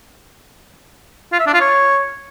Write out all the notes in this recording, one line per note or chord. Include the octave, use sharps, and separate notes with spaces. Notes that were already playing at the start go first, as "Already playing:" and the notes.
F4
E5
D4
F4
C#5